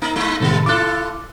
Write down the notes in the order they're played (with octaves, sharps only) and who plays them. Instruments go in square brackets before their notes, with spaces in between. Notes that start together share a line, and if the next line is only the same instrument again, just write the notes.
[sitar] A#3 D#4 A#4
G#3 D#4 E4
[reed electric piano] A2 C3 D#3 [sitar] G3 B3 A4
[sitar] E4 F4 A4 [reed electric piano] D6 F#6